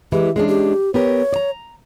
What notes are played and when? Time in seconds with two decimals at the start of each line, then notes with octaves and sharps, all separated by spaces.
0.12 E3 G#3 E4 G4
0.36 G#3 C#4 D4 G#4
0.48 G4
0.94 B3 G4 A#4 C#5
1.33 D5 A#5